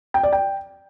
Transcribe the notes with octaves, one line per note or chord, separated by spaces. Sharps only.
G5
D5
G5